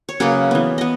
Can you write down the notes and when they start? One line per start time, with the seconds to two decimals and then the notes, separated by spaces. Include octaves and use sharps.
0.09 C#5
0.20 C#3 F#3 A#3 G#4 B4
0.51 E3 B3
0.78 B3 D#5